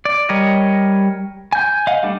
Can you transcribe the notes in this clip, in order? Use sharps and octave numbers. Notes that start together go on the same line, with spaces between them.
D5
G3 A#4 C#5 D#5
G#5 G6
D#5 F5 F#5
G3 A3 D4